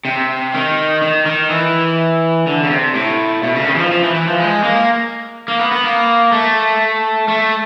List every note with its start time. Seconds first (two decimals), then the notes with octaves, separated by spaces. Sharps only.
0.05 C3
0.54 D#3
1.02 D#3
1.26 D#3
1.50 E3
2.47 D3
2.63 C#3
2.70 C3
2.95 A2
3.43 B2
3.55 C#3
3.63 D3
3.68 D#3
3.75 E3
3.79 F3
3.92 F3
4.03 E3
4.15 E3
4.27 F3
4.40 G#3
4.63 A#3
5.48 A#3
5.60 B3
5.71 B3
5.84 A#3
6.32 A3
7.28 A3